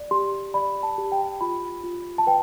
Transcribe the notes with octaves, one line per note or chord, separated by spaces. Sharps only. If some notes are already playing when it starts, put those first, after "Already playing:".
Already playing: D5
G4 C6
D5 B5
A5
G4
G5
F4 B5
F4
A5
B4 G5